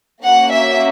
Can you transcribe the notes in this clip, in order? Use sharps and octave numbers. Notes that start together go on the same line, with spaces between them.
A#3 C#4 F#4 F#5
E5